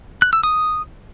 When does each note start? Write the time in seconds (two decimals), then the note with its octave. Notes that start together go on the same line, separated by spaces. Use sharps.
0.22 F#6
0.33 E6
0.43 D#6